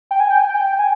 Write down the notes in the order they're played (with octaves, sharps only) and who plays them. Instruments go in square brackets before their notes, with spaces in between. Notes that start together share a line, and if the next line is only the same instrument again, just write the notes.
[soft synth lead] G5
G#5
G5
G#5
G5
G#5